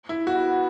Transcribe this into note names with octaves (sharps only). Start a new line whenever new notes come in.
E4
B3 F#4